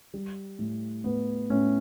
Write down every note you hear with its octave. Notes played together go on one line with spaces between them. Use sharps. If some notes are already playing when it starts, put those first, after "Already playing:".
G3
A2
A2 B3
A2 C#4